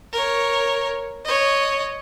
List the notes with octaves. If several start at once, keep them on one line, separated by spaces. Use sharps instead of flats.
A#4 C#5
C#5 D#5